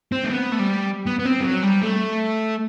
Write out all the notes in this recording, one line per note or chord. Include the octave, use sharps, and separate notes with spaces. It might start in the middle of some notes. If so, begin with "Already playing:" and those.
C4
A3
B3
A3
G3
B3
B3
C4
G3
F#3
G3
A3